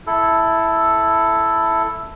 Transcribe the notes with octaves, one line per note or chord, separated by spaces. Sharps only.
E4 A4